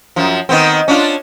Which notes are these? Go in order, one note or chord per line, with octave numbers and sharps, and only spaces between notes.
F#2 F3
D#3 B3 C4
C#4 D4 F4